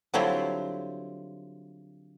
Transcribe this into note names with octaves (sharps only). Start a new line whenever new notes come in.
D3 F#3 G3 C4 E4 F4